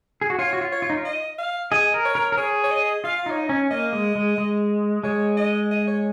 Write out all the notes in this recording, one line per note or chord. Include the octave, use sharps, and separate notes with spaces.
G#4
F#4
F4 C#5
F#4
F4
C#5
F4
D#4
F4
D#5
F5
G#4 D#5
A#4
C#5
A#4
A#4
G#4 C#5
C#5
D#5
F4 F5
D#4 C#5
D#5
C#4
A#3 D#5
G#3
G#3
G#3
G#3 C#5
D#5
D#5
C#5